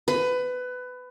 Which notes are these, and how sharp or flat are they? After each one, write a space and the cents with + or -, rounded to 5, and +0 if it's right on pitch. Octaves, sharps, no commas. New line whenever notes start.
B4 +20